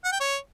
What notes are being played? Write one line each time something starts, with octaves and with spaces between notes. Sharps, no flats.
F#5
G5
C#5